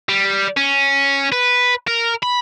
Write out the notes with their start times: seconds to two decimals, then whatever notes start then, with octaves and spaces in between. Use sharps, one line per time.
0.09 G3
0.57 C#4
1.32 B4
1.87 A#4
2.23 B5